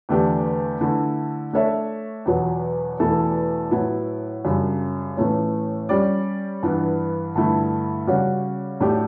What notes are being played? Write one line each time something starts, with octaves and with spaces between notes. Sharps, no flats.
E2 D3 A3 D4 G4
D3 A3 E4
A3 D4 A4 C#5 E5
E2 B2 F#3
E2 B2 A3 E4 A4
A2 F#3 B3 E4
F#2 C#3 G3 D4
A2 E3 A3 C#4
G3 C#4 G4 D5
G2 E3 B3
G2 D3 A3 E4
C#3 G3 C#4 F#4
A2 F#3 A3 D4 G4